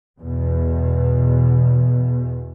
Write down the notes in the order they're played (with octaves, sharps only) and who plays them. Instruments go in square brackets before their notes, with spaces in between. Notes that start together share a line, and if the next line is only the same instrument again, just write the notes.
[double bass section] E2 B2